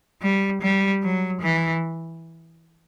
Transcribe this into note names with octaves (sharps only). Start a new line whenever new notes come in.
G3
G3
F#3
E3